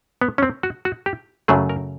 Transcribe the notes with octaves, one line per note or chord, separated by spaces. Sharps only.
B3
C#4
C4
F#4
F#4
G4
F#2 C#3 F#3 A3 G#4
A#4